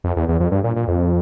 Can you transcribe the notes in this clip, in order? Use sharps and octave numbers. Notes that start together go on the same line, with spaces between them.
F2
E2
E2
F2
G2
A#2
A#2
F2